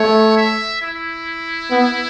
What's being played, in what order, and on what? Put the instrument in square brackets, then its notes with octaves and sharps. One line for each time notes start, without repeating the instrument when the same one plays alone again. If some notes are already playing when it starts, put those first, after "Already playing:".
Already playing: [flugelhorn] A3 [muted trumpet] C#5
[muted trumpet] E5
E4
[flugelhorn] B3